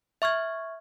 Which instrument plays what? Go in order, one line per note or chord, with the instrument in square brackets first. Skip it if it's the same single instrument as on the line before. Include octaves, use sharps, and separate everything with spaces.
[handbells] E5 C#6 F6 G#6